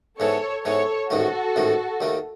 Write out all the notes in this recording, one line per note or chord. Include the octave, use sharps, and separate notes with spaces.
G#2 E3 B3 A4 C#5
G#2 E3 B3 A4 C#5
A1 G#2 D#3 A3 F#4 A4
A1 G#2 D#3 A3
D#2 D#3 A3